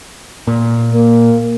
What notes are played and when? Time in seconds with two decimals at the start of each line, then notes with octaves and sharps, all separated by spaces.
0.47 A#2
0.93 A#3